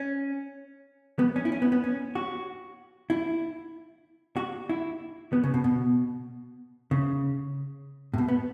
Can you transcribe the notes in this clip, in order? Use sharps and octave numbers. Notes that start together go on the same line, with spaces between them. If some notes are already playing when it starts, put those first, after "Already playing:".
Already playing: C#4
B3
C#4
E4
C#4
B3
B3
C#4
F#4
E4
F#4
E4
B3
C#3
B2
B2
C#3
A2
B2
B3